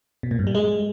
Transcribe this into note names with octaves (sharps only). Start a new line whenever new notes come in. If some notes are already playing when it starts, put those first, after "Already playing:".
B2
A#2
G2
G3
G#3